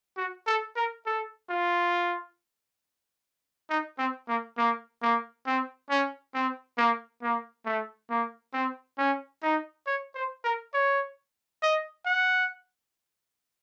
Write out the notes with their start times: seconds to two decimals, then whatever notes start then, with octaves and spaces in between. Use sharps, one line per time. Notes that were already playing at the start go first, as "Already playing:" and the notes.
0.17 F#4
0.47 A4
0.76 A#4
1.06 A4
1.50 F4
3.70 D#4
3.99 C4
4.28 A#3
4.57 A#3
5.02 A#3
5.46 C4
5.90 C#4
6.34 C4
6.78 A#3
7.23 A#3
7.65 A3
8.10 A#3
8.53 C4
8.98 C#4
9.43 D#4
9.87 C#5
10.15 C5
10.44 A#4
10.74 C#5
11.62 D#5
12.06 F#5